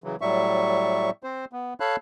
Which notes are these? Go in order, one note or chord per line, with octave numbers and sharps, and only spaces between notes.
C#3 E3 F#3
A2 F#3 G3 E5 C#6
C4 C5
B3
A4 C#5 F5 A5 B5 F#6